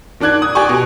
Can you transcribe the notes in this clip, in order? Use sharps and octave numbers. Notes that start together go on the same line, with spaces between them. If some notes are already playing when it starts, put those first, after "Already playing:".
D#3 D4 D5 F#6 G#6
D#6
G4 D5 G#5 C#6
B2